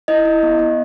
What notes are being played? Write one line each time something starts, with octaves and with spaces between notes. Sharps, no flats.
E4 D#5
E4
B3
B3